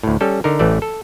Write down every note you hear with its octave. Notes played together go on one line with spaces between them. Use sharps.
D2 A2
G3 C#4 A4
D3 D#4 A#4
A1 E3 A3 D5
A4